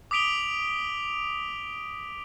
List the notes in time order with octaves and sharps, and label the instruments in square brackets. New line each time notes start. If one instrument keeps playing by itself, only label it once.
[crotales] D6 D#6 B6 D7 F7 G7